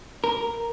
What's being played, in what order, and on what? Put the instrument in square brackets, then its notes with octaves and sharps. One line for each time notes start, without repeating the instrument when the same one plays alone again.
[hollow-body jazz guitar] A#4